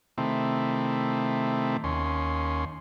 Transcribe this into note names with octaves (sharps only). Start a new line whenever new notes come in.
C3 D#3 A3 C4 E4
D#2 C#4 C6